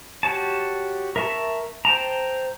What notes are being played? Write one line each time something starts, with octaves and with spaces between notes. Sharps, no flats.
F#4 G4 C#5 A5
A#4 E5 A5 C#6
C5 G5 A5 A#5